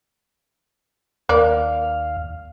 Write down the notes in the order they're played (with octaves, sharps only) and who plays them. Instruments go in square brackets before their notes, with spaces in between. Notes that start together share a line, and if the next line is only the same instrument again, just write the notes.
[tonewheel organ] D#2 F5 [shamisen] A#3 D5